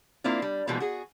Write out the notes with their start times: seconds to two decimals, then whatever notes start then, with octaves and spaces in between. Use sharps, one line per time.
0.24 A#3 C4 D4 E4 F4
0.42 G3
0.67 B2 E3 F3 G3 G#3 A#3
0.80 F#4 G#4